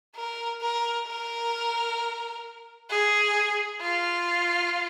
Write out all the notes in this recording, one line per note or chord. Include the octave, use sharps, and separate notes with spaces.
A#4
A#4
A#4
G#4
F4